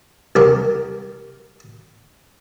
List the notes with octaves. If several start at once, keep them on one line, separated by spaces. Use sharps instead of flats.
C2 G4 A#4